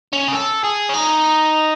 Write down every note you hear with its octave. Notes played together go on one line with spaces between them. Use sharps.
C#4
G#4
A4
G#4
C#4
D#4